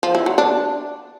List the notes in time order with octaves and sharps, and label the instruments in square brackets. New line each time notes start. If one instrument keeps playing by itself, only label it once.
[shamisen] F3
E4
F#3
D4